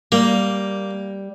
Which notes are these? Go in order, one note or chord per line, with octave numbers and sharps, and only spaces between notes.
G3 A#3